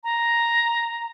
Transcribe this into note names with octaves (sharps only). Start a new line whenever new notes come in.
A#5